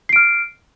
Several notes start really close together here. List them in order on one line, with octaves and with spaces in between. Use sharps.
C7 D7 F6